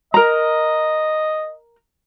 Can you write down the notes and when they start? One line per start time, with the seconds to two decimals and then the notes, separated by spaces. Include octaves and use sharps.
0.14 A#4 D#5 A#5